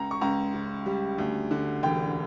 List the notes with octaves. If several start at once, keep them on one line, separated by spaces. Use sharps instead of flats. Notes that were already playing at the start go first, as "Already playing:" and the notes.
Already playing: C#2 A#5
C#6
C#2 A#5
C#3
G3
D2
D3
E1 G5